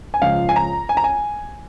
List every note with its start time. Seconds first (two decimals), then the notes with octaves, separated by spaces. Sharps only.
0.14 G#5
0.22 C#2 C#3 F3 F5
0.49 G#5
0.56 A#5
0.89 G#5
0.97 A#5
1.04 G#5